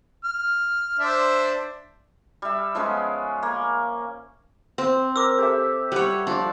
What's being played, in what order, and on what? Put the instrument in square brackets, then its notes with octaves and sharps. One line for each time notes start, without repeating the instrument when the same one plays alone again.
[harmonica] F6
D4 C5 E5
[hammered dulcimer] G3 E5
F3 G#3 B3 C#4
A#3
[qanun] C4
[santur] A#4 [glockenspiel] D6 E6
[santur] G4 A4 E5
[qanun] G3 C#5 [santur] F#5
[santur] F3 D5 [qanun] D4